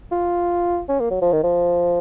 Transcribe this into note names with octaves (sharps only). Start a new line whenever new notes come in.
F4
C#4
A#3
F#3
F3
D#3
F3